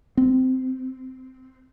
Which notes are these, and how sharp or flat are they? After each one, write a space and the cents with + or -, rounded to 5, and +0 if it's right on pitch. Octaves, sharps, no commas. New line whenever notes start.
C4 -15